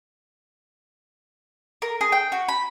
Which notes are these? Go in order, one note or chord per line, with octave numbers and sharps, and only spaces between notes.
A#4
G#4
G5
F#4
B5